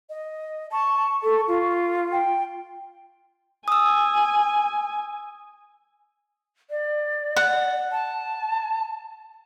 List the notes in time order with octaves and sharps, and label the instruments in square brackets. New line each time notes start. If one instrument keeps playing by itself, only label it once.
[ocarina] D#5
[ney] A5 [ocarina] C#6
[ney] A4
F4
[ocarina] G5
[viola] G#5 [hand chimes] D#6 E6
[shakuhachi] D5
[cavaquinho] F#5
[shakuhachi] A5